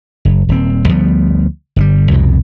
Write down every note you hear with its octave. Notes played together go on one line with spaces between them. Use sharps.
F#1
D#1 C4
D2 F3 G3 B3
G1 D#3 G3
C2 F2 B2